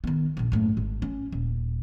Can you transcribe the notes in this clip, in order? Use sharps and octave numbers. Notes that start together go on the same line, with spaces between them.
D#3 B3
A#1 F2
F#1 A2
G#1
C#4
D#1